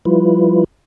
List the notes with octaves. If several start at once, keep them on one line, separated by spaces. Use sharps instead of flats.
F3 G3 E4 F4 B4